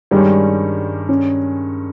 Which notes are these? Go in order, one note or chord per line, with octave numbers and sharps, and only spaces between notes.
G2 D#3 G3 G#3 C#4
C#4